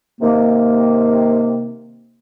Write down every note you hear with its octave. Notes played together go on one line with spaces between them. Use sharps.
C3 D#3 A#3